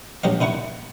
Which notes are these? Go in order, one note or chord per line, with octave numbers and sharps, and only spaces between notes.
A#1 F#3 G4 D#5 F5
A#2 D#4 E4 F#5 C#6